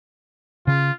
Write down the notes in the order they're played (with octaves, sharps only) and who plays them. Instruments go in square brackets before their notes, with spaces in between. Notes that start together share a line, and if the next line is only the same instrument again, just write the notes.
[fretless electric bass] C#3 C#4 [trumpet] F4